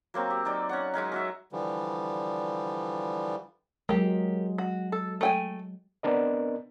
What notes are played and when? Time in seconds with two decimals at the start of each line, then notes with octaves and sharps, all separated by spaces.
0.14 F#3 A#3 C4 C#5
0.30 G4
0.45 F#3 D#4 D5 G5
0.69 C#4 C#5 F#5
0.94 F#3 G#3 C#4 D#4
1.12 C#4 F#4 E5
1.52 D3 E3 F3 G3
3.89 F#3 G#3 A#3 G4
4.58 F#4
4.92 A4
5.21 A3 G5 G#5
6.03 B3 C4 D4 A#4 D#5